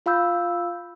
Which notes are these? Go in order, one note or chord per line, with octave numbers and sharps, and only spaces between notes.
F4 F5 B5 E6 G6